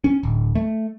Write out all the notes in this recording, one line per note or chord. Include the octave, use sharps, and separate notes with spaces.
C#4
D1
A3